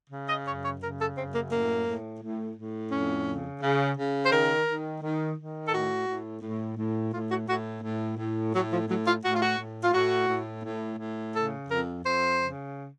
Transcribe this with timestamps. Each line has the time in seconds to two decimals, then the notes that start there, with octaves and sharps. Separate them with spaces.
0.10 C#3
0.27 D#5
0.45 F#2 C#5
0.63 C#5
0.80 C#3 A#4
0.98 A4
1.16 F#2 C4
1.33 A#3
1.51 A2 A#3
1.86 A2
2.21 A2
2.56 A2
2.91 F2 C#4
3.27 C#3
3.61 C#3
3.96 C#3
4.25 C5
4.31 D#3 A#4
4.66 D#3
5.02 D#3
5.37 D#3
5.67 A4
5.72 A2 F#4
6.07 A2
6.42 A2
6.77 A2
7.13 A2 F4
7.30 F#4
7.48 A2 F#4
7.82 A2
8.18 A2
8.53 A2 F#3
8.71 F3
8.88 A2 F#3
9.06 F4
9.23 A2 F#4
9.33 F4
9.41 F#4
9.58 A2
9.82 F4
9.94 A2 F#4
10.28 A2
10.64 A2
10.99 A2
11.34 C#3 A4
11.69 F2 A#4
12.04 F2 C5
12.39 C#3